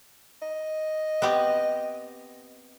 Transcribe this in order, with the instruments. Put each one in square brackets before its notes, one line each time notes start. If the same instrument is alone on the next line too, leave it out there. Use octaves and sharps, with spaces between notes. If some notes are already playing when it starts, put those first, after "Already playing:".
[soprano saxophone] D#5
[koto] B3 C4 G4